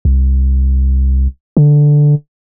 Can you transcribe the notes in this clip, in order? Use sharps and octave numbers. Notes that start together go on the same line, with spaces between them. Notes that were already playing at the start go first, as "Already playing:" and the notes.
C2
D3